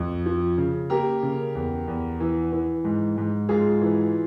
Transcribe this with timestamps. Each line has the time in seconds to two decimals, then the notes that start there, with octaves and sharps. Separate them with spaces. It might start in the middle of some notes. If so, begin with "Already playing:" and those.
Already playing: F2
0.26 F3
0.58 C#3
0.90 A#3 G4 A#4
1.23 C#3
1.55 E2
1.88 E2
2.20 E3
2.52 E3
2.84 G#2
3.17 G#2
3.49 G#2 F4 G#4
3.82 E3